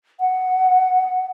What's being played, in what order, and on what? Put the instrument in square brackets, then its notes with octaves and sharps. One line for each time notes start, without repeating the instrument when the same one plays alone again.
[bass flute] F#5